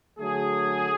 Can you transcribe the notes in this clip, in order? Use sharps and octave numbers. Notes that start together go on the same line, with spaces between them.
D3 F#3 A3 G#4